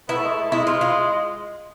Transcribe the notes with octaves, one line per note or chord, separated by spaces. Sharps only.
B3 E4
A3
G#3
A3
G#3 E4
F4
F4